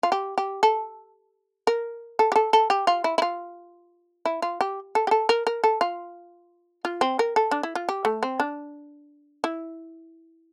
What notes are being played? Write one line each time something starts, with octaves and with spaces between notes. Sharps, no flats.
F4
G4
G4
A4
A#4
A4
G4
A4
A4
G4
F4
E4
E4
F4
E4
F4
G4
A4
G4
A4
A#4
A#4
A4
F4
F4
C4
A#4
A4
D4
E4
F4
G4
A3
C4
D4
E4